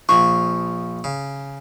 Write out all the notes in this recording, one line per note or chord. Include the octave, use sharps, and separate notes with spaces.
A#1 F3 C#6
C#3